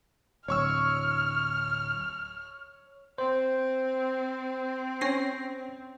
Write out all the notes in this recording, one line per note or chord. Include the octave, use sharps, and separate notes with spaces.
D1 C#5 C#6 E6 F6
C4 C5
C#4 A#6 C7